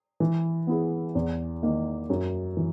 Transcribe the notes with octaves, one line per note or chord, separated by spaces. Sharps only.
E3
B3 E4 G#4
E2
D#3 A#3
F#2
E3